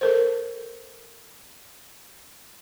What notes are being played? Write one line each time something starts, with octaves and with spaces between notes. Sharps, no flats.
A4 A#4 C5